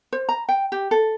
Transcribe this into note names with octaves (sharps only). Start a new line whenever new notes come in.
C5
A#5
G5
G4
A4